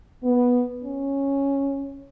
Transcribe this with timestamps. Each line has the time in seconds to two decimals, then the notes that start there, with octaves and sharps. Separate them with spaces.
0.24 B3
0.82 C#4